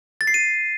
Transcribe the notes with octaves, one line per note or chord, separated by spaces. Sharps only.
A6
C7
D#7